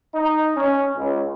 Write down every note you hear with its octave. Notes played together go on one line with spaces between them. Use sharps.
D#4
C#4
C#2